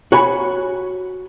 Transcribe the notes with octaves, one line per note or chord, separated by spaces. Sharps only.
F#4 C#5 G#5 B5